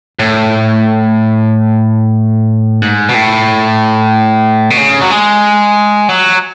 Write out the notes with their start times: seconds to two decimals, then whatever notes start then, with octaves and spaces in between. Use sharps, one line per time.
0.19 A2
2.82 G#2
3.09 B2
3.15 A2
4.70 B2
4.77 C#3
5.01 F#3
5.11 G#3
6.09 F#3